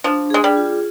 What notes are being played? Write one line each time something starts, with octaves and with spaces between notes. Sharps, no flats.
F3 D4
G#3 G#4
G3
F4